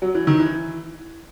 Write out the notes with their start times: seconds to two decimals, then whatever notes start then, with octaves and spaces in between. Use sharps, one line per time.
0.02 F#3
0.15 E3
0.27 D#3
0.40 E3